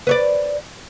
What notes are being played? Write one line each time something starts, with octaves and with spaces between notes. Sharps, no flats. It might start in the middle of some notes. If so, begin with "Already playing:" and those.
B4 C#5 D5